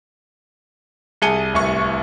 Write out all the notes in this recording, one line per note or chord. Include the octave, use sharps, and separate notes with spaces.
C2 G#4 A5 C#7 D#7 G7
D1 C2 C#6